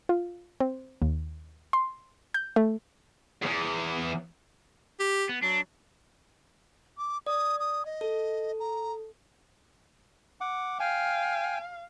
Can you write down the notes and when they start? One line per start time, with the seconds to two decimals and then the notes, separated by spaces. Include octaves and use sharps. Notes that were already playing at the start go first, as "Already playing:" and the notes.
0.09 F4
0.60 C4
1.02 D#2
1.73 C6
2.34 G6
2.56 A3
3.42 E2 G#2
5.00 G4
5.29 B3
5.43 F#3 D4
6.98 D6
7.26 D5 D#6
7.60 D#6
7.86 D#5
8.01 A4
8.60 A#5
10.41 F#5 D6
10.80 F5 G5 G#5